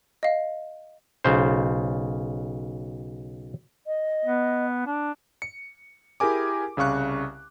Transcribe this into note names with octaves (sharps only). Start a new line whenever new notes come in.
D#5 F5
B1 C#3 C5
D#5
B3
D4
C#7
E4 G4 G#4 A#4 G#5 D6
C2 C#3 F5 C#6 F#6